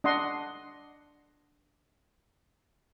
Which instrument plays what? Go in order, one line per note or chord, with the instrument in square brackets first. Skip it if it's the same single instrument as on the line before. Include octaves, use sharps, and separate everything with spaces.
[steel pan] D4 D#5 F#5 C6